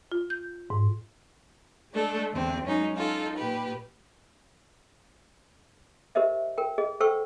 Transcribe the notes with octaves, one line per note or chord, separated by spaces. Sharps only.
F4
G6
G#2
G#3 A3 D4 A4
E2 D3 C4
F#2 G#3 C#4 D#4
D#4 F4 A4
A#2 G4 B4
G4 A#4 C5 D#5 E5
A#4 G5
G#4 D#5
A4 C5 F#5 G5 C#6 E6